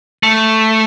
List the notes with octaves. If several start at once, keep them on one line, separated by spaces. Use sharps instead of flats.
A3